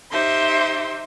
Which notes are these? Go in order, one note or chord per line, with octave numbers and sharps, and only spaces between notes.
D#4 G4 C5 E5 C6